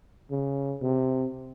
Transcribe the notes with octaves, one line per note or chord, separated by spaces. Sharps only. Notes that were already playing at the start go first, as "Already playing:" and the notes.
C#3
C3